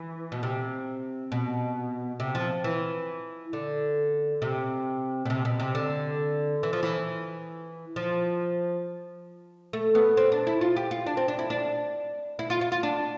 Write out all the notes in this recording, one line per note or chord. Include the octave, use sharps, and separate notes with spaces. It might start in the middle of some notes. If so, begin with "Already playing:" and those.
Already playing: E3
B2
C3
B2
C3
F3
E3
D3
C3
B2
C3
B2
C3
D3
E3
F3
E3
F3
A3
B3
C4
D4
E4
F4
G4
F4
D4
C4
D4
E4
D4
E4
F4
F4
F4
D4